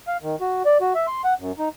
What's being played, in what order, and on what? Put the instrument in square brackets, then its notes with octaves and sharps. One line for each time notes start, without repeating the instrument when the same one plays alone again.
[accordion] F5
D#3
F#4
D5
F#4
E5
C6
F#5
F#2
D#4